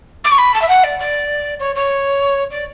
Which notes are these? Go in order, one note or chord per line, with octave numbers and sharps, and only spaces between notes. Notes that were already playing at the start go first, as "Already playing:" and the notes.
D6
C#6
B5
A5
E5
F#5
D5
D5
C#5
C#5
D5